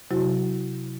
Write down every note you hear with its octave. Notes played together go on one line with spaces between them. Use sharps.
C3 F#3 E4 F#4